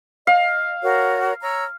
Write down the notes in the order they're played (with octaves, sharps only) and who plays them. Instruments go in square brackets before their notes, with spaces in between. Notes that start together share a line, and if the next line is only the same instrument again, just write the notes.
[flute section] D#5 [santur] F5
[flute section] F#4 A#4 C#5
C#5 A#5 E6